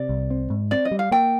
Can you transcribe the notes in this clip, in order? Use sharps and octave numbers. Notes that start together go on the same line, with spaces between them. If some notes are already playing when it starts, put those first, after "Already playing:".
Already playing: C3 D5
C2
C4
G#2
C4 D5
D#5
G3
F5
A#3 G5